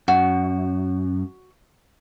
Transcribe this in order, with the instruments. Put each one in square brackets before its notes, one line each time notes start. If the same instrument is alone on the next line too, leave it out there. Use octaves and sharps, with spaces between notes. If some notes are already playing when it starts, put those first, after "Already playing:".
[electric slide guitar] F#2 [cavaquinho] F#4